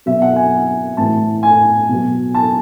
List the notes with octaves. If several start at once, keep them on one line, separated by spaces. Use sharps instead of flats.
B2 F#3 E5
F#5
G#5
A2 E3 A5
G#5
B2 F#3
A5